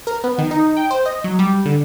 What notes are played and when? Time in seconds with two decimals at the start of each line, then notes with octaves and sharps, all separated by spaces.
0.07 A#4
0.24 B3
0.38 D#3
0.51 D#4
0.77 G5
0.91 C5
1.06 D#5
1.24 F#3
1.39 G3
1.66 D3